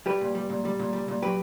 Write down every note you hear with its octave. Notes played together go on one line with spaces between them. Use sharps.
G3 G4 B4
A#2
G3
A#2
G3
A#2
G3
A#2
F#3 G4 B4